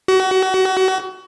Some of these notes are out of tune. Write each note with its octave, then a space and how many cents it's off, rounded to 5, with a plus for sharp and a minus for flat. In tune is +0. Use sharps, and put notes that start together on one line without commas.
F#4 +30